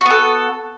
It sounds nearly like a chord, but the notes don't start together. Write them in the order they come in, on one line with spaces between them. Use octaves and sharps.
F#4 B3 A4